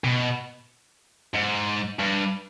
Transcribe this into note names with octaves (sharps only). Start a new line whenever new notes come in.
B2
G#2
G2